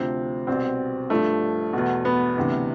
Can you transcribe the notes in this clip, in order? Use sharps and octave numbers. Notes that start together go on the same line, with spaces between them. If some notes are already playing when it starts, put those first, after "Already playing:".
Already playing: D2 C3 F3 C4
C2 B2 C4
G2 F3 A3
E2 B2
B3
D2 C3 E3